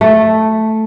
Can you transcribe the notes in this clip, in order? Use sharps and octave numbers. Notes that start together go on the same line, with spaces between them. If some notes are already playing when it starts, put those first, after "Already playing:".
A3